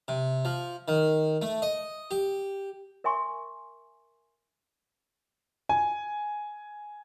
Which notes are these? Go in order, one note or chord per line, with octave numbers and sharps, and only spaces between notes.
C3
F3
D#3
A3
D#5
G4
A#4 E5 G#5 C6 C#6
G#5